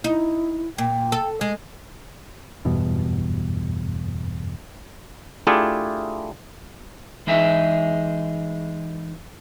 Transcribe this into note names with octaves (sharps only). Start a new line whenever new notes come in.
D#4 E4
A#2 G5
A4
G#3
F#1 E2 G2 B2
A3 D4 E4 F4 G4 G#4
E3 G#3 D#4 G#4 E5